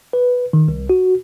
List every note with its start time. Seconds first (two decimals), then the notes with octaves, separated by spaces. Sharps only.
0.13 B4
0.53 D#3
0.68 C2
0.90 F#4